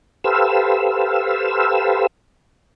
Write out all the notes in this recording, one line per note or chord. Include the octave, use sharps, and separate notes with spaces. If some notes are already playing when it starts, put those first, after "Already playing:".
G4 A4 B4 C5 F5 E6